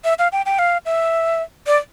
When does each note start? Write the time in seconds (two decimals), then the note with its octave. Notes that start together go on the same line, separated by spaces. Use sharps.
0.04 E5
0.19 F5
0.32 G5
0.46 G5
0.59 F5
0.85 E5
1.67 D5